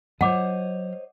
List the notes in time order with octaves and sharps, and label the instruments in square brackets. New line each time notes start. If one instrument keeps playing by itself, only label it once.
[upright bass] F#3 F4 [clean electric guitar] C5 C#5 D#5 [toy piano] F#5 D6